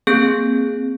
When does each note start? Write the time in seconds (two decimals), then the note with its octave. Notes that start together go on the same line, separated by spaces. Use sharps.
0.07 A#3 C4 G#4 G6